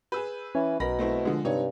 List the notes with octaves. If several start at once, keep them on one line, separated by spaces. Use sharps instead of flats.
G#4 B4 E6 G6
E3 C#4
B1 B2 A#4 B5 A#6
A3 C4 E4
D3 F3 G#3
G2 C3 D#4 C#5